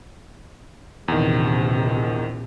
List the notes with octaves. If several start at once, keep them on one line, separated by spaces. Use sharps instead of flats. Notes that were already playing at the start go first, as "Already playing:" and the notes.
A#1 E2 C3 D#3